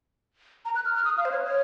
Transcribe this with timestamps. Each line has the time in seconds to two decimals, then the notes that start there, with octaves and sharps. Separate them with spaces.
0.65 A#5
0.75 F#6
0.85 F6
0.96 F6
1.05 D#6
1.18 F5
1.25 C5
1.31 C#5
1.45 C#5